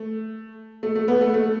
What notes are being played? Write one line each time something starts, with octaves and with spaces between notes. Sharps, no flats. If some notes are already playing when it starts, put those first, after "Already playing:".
Already playing: A3
A3
A3
B3
A3
A3